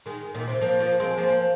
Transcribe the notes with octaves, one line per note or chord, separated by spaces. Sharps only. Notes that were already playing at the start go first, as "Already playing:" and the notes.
D#3 G#3
A#2 D#3
C3
F3 A#3
F3 A#3
G#3 C4
F3 A#3